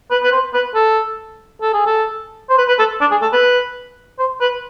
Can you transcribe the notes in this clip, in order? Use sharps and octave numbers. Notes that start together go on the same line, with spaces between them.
B4
B4
C5
B4
A4
A4
G#4
A4
C5
B4
B4
A4
D4
G#4
A4
B4
C5
B4